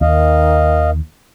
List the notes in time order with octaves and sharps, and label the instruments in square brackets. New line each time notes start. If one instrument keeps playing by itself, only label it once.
[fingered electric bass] D#2 [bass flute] D#3 [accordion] D#5 F5